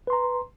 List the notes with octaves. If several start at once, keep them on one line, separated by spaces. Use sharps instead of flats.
B4 A#5 C6